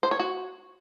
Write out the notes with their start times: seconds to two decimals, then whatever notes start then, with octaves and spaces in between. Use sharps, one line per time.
0.03 C5
0.11 C#5
0.20 F#4